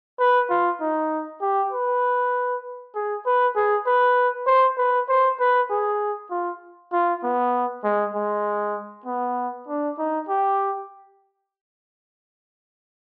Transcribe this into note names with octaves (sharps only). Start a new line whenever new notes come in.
B4
F4
D#4
G4
B4
G#4
B4
G#4
B4
C5
B4
C5
B4
G#4
F4
F4
B3
G#3
G#3
B3
D4
D#4
G4